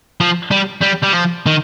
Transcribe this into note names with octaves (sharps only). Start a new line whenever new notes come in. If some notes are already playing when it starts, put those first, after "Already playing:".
F3
G3
G3
G3
F3
D#3